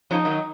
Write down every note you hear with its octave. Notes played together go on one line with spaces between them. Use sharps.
C#3 F3 D#4
D#3 F#3